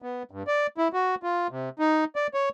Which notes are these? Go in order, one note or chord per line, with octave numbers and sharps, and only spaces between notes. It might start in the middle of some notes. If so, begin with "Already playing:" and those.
B3
G2
D5
E4
F#4
F4
C3
D#4
D5
C#5